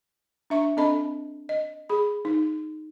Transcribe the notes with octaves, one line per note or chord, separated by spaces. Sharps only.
D4 E5 C#6
C4 D4 A4 D#5 A5 B5
D#5
G#4 B5
D#4